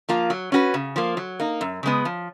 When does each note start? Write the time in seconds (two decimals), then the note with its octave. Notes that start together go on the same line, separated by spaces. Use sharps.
0.09 F3 A#3 F4
0.30 F#3
0.52 C#4 F#4 B4
0.74 C#3
0.96 F3 A#3
1.17 F#3
1.40 A#3 D#4
1.61 F#2
1.83 C#3 G#3 B3
2.05 F3